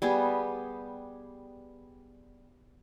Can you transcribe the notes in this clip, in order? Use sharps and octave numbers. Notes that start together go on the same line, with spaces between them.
G3 B3 G4 G#4